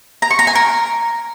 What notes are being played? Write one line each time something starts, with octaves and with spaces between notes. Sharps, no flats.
A#5
C#6
A#5
G#5
A#4